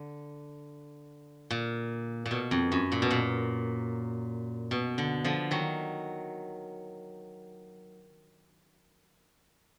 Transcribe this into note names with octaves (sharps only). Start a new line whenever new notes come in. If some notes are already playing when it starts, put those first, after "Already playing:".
Already playing: D3
A#2
A#2
B2
F2
F#2
A#2
B2
A#2
B2
D3
D3 F3
D#3 F#3